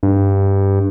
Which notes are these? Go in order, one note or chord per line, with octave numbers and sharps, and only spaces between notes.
G2